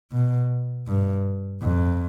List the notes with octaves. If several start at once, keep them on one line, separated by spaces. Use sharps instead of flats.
B2
G2
F2